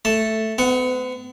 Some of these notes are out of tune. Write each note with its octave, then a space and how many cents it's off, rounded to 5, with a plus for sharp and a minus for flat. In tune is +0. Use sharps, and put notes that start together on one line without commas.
A3 +0 A5 +0
B3 +45 F#5 +0